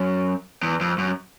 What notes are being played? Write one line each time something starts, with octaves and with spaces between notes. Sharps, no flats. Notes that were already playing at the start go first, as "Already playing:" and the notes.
Already playing: F#2
E2
F2
F#2